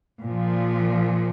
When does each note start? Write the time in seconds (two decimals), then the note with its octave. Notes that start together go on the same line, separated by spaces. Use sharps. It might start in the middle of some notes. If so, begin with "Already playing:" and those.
0.22 A#2 F3